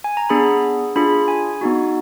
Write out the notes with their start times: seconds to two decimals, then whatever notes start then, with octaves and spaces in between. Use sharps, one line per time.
0.04 G#5
0.17 A#5
0.29 B3 D4 G#4 B5
0.96 D4 F4 G#4 B5
1.28 G#5
1.61 B3 D#4 F#4